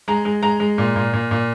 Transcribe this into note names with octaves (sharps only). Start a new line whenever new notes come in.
G#3 A#5
G#3
G#3 A#5
G#3
A#2
A#2
A#2
A#2